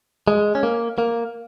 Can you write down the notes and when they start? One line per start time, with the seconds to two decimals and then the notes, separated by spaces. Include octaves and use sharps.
0.28 G#3
0.55 C#4
0.63 A#3
0.98 A#3